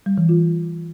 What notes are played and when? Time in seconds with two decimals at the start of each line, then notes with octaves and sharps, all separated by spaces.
0.06 G3
0.18 E3
0.29 F4